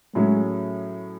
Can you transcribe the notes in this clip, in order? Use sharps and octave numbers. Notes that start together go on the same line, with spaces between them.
A2 F#3 G#3 C#4 G#4